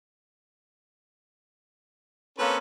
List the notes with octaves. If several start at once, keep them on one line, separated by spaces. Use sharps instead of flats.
A#3 C4 C#4 A4 B4 C#5